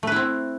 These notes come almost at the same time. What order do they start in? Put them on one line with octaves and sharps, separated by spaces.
A3 B4 E4 C4